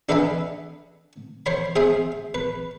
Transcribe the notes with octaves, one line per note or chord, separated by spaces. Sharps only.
D4 A4 B4 D#5 E5 G#5
C5 C#5 B5
G#4 C5 E5 D#6
B4